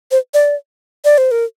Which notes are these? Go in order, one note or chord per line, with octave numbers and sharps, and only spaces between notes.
C5
D5
D5
C5
A#4